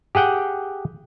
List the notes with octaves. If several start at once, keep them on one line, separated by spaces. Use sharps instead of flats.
G4 G#4 F#5 G5